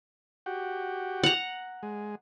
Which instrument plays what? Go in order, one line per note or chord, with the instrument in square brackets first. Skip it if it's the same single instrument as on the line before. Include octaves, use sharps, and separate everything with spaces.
[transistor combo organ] F#4 G4
[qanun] F#5 A#5
[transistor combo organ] G#3